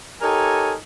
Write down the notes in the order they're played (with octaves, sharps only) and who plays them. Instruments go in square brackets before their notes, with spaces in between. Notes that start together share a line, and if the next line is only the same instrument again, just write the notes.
[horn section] D#4 G4 A4 A#4 C#5 G#5